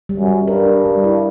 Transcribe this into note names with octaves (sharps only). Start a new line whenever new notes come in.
G3
F#2
G3
G2 A#4
D4
G3
E4